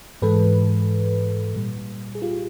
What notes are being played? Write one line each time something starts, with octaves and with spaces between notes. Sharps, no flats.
G#2 E3 G#3 A4 B4
A#2 G3
G#4
F4 G4